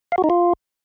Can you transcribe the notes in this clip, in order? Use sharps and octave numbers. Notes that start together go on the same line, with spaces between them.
F5
F#4
D#4
F4